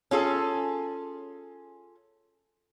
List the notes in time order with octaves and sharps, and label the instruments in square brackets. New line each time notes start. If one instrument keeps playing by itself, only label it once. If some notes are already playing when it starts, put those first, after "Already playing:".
[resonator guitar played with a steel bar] C#4 F4 G#4 A4